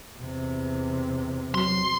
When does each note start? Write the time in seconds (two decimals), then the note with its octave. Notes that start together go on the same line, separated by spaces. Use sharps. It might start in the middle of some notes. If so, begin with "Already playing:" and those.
0.18 E2 C3
1.54 F#3 C6